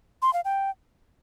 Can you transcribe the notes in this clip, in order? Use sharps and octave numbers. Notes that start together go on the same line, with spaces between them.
C6
F5
G5